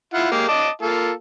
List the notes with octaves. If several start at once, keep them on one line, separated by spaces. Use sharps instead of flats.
E4 F4 F#5
G#3 A#3 G4
D#5 A5 D6
A#3 F4 A4